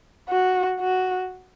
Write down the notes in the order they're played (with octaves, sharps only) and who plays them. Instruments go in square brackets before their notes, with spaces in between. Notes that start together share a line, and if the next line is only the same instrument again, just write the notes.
[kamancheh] F#4
F#4